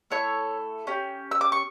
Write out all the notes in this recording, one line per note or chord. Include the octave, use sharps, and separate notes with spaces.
A3 E4 A4 C#5 C#6
C#4 G4
E6
D6
C#6